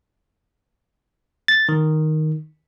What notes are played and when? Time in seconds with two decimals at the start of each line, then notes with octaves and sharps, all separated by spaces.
1.48 A6
1.69 D#3